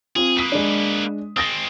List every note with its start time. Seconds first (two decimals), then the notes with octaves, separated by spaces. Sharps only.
0.16 C4 F4 G#4
0.37 A#3 B4 D#6 B6 D#7
0.52 G#3 D4
1.37 G#3 C4 D#6 A6 A#6